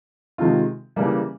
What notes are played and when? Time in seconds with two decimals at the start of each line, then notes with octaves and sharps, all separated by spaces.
0.38 C3 D#3 G#3 C4 F4
0.96 C#3 E3 G3 A#3